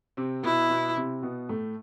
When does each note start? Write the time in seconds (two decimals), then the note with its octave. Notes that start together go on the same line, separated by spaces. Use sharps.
0.17 C3 C4
0.43 B2 B3 E4
0.70 B2 B3
0.96 C3 C4
1.22 B2 B3
1.49 A2 A3